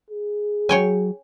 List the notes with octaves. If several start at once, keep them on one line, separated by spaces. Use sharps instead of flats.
G#4
F#3 C#5 G5 G#5